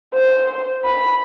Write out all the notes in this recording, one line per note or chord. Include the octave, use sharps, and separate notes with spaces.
C5
B5